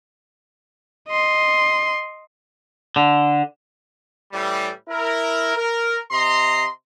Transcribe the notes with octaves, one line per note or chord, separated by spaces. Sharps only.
D#5 C6
D3
A2 E3 G3
E4 A#4
A#4
C3 D#5 A#5 C6